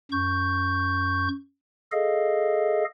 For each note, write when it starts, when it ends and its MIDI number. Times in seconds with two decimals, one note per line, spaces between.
0.12 1.28 42
0.12 1.28 85
0.12 1.28 91
1.92 2.85 68
1.92 2.85 69
1.92 2.85 75
1.92 2.85 77